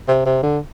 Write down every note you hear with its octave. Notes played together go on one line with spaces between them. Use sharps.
C3
C3
D3